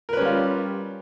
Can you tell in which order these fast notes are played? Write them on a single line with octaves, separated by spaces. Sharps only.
A#4 B4 C#4 G3 F4